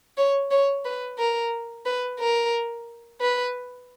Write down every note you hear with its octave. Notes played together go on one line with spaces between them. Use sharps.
C#5
C#5
B4
A#4
B4
A#4
B4